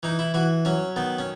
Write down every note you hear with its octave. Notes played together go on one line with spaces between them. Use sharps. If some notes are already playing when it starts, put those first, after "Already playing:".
E3 D#4
E4
E3 F#4
F#3 C#4
D#3 B3
C#4